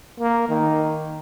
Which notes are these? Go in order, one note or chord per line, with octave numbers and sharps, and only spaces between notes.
A#3
D#3